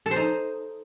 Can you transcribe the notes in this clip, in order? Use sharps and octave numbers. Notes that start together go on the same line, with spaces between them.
A4
C5
D#4